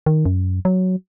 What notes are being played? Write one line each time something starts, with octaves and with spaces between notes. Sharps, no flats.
D#3
F#2
F#3